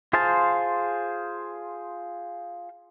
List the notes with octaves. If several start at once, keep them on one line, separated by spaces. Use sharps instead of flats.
F4 G#4 C5 F5 A5